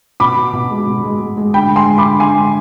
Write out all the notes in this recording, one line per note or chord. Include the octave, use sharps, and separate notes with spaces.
B2 B5 D6
B2
B2
G#3
B2
G#3
G#3
G#3
D3 G5 B5
G#3
G#5 C6
G#3
B5 D6
D3
D3 G#5 C6
G#3